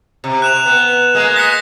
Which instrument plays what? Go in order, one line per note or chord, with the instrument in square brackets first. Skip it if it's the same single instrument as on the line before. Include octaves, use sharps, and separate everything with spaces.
[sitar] C3
[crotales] F#6 E7 F7
[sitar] B3
G#3 A#3
[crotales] A#6 B6 C#7